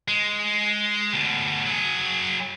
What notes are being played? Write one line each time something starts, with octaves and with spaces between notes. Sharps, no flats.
G#3
D2 B2
F#3 G#4